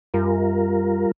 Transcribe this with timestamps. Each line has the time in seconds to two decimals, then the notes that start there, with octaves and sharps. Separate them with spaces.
0.14 F#2 G3 F4 A#4